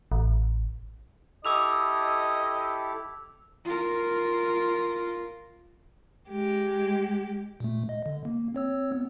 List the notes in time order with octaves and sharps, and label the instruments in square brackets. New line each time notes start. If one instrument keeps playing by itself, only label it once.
[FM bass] A1
[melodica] E4 G4 A4 [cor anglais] D#5 [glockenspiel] D6 E6 F7
[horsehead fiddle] F4 A#4
[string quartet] G#3 G4
[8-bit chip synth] A#2 A3
D#5
D3
A#3
C4 C#5 E6
B3